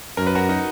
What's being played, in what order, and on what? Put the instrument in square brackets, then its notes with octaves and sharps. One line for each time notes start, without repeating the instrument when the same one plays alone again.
[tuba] F#2 [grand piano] A#4
[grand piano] B4
F#4 A#4
D#4 F#4